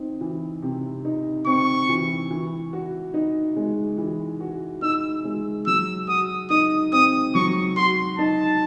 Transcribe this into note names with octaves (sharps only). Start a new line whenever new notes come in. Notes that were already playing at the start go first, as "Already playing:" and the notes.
Already playing: C4 D#4
E3
C3
D#4
C4 C#6
E3
E3
F#4
D#4
G#3
E3
F#4
D#4 E6
G#3
F#3 E6
F#4 D#6
D#4 D#6
C4 D#6
F#3 C#6
F#4 C6
D#4 A5